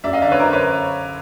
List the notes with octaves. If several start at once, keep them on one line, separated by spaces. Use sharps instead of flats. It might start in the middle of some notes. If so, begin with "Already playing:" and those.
F#2 D5 E5
D#5 F5
D3 D5 E5
B4 C#5
F#2 A#4 C5
B4 C#5